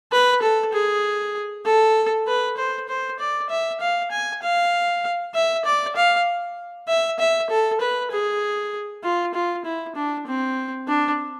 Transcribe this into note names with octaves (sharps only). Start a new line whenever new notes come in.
B4
A4
G#4
A4
B4
C5
C5
D5
E5
F5
G#5
F5
E5
D5
F5
E5
E5
A4
B4
G#4
F4
F4
E4
D4
C4
D4